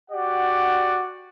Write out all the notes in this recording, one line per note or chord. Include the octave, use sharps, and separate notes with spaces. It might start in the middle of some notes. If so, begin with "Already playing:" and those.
F#4 G4 D5 F#5